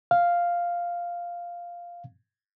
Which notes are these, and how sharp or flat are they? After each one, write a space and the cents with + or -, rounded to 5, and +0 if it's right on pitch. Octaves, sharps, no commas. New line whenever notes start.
F5 +0